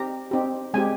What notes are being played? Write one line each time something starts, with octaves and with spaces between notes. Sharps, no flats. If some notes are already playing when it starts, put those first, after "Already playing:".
Already playing: C4 D#4 G4 A#5
C4 D#4 G4
G#3 C4 G4 G#5